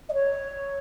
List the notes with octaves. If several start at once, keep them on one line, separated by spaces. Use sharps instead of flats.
D#5
C#5